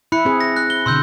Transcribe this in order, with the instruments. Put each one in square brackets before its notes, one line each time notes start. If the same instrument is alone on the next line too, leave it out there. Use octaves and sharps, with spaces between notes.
[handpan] E4 [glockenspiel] B5 F#6 C#7
[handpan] C4 G#4
[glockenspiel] A#6
F#6
G7
[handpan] B2 D3 [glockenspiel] C6 E6 G6